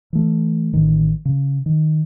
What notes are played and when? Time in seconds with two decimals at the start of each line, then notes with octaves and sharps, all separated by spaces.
0.13 E3 A3
0.73 A1 D#3
1.25 C#3
1.66 D#3